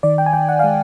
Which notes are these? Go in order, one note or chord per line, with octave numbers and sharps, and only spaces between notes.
D#3 D5
G5
G#5
D#3 G5
F#5
G#3 F5